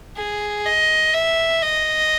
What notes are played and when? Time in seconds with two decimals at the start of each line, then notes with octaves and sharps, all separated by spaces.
0.17 G#4
0.66 D#5
1.14 E5
1.62 D#5